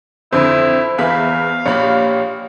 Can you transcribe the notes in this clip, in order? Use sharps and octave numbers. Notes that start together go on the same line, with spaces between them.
F2 D3 E4 C5 C6
E2 E3 F5 B5 B6
A#1 A#2 G4 C#5 B5